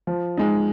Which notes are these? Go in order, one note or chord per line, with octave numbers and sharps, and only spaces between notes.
F3
G#3 D#4